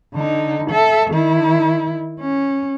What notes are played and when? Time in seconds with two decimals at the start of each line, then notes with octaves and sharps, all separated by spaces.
0.14 D3 D#4
0.70 A4 E5
1.10 D#3 E4
2.21 C#4